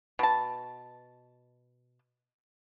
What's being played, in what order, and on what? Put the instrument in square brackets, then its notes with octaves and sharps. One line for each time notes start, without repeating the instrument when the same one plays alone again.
[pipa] B2 A5